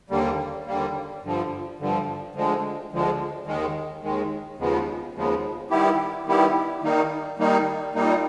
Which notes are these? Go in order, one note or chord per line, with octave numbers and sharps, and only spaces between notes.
D#2 D3 G3 A#3
D#2 D3 G3 A#3
G2 D3 F3
G2 D3 F3
D2 D3 F3 G#3
D2 D3 F3 G#3
D#2 D#3 G#3
D#2 D#3 G#3
D#2 C#3 F3 G#3 B3
D#2 C#3 F3 G#3 B3
D#3 G3 B3 E4 G4
D#3 G3 B3 E4 G4
D#3 G3 A#3 D#4
D#3 G3 A#3 D#4
A#2 G3 A#3 D#4